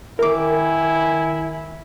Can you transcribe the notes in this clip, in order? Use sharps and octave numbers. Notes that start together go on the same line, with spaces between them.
D#3 E4 A#4 G#5 D6